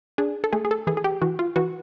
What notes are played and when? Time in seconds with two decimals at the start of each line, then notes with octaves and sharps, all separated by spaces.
0.18 D4 G#4
0.44 A4
0.53 A3 G#4
0.65 G#4
0.71 A4
0.87 E3 G#4
0.97 G#4
1.04 G4
1.22 E3 F#4
1.39 F4
1.56 E3 F#4